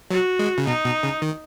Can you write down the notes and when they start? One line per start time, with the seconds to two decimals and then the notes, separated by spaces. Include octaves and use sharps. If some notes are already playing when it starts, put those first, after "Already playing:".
0.11 F#3 F#4
0.39 G#3
0.58 C#3
0.66 B2 D#4
0.85 B2
1.03 C#3
1.22 D#3